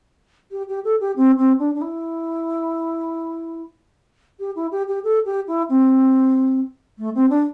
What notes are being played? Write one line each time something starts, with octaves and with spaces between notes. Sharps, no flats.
G4
G4
A4
G4
C4
C4
D4
D4
E4
G4
E4
G4
G4
A4
G4
E4
C4
A3
C4
D4